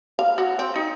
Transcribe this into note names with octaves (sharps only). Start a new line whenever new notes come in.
F5
F#4
C4
D#4